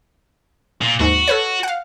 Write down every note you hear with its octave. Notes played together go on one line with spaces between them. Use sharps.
A#2
D#2 G#2 F#4
A4 B4 C#5
F5 F#5